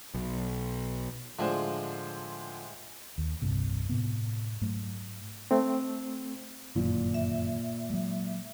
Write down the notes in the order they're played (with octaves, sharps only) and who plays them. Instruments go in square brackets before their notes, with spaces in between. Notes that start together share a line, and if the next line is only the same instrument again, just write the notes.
[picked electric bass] B1
[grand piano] A2 G#3 C5 [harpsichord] D3 F3
[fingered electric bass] D#2
E1 C2 G2 C3
A2 C3 B3
G#2 F#3 A3
[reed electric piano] A3 C4
[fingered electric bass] G1 F#2 D#3 [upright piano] A#2
[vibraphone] E5
[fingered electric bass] F#3 G#3